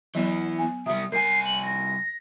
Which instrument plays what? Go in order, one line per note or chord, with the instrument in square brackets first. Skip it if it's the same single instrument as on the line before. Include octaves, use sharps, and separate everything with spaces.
[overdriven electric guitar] E2 E3 [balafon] F#3 B3 D5
[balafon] B3 G#5
[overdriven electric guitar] C3 G3 [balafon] E5 [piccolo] D#6
[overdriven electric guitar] C2 G#5 [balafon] A#4 [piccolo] C7
[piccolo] F#7
A#6